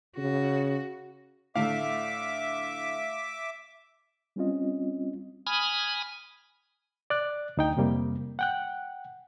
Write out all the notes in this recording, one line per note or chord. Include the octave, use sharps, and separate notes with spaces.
C#3 F#4
A2 D3 A3 E5 F5 D6
G3 C4 C#4 F4 D#5
G#5 B5 D#6 F6
D5 F#6
D2 D#4 G5
F2 C3 G3 A#3
F#5 G5 F#6